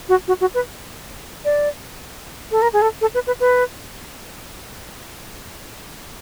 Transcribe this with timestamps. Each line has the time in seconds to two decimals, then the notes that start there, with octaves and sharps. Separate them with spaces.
0.09 F#4
0.28 F#4
0.41 F#4
0.54 B4
1.45 D5
2.51 A4
2.62 A#4
2.73 G#4
2.82 A4
3.01 A4
3.14 B4
3.27 B4
3.40 B4